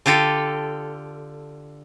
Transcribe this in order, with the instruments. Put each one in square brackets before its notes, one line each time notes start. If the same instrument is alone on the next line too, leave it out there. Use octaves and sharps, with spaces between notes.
[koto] D3 F4 G4 A4